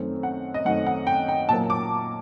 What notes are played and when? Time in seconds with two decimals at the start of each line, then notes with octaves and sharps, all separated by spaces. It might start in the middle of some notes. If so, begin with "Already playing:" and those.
Already playing: F#2 D#3 A3 C4
0.23 F#5
0.54 D#5
0.65 F#2 D#3 A3 C4 F#5
0.87 F#5
1.07 G5
1.28 G5
1.49 A#2 F#3 A#3 A5
1.70 D6